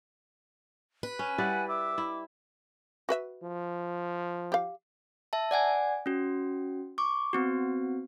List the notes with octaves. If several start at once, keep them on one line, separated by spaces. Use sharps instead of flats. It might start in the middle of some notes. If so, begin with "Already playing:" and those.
B4
C#4 G#5
G3 E4 D5 F#5
E5 D6
E4
F#4 B4 E5
F3
G4 F5
E5 A5
D5 F#5 G#5 G#6
C#4 F#4
C#6 D6
B3 C4 F#4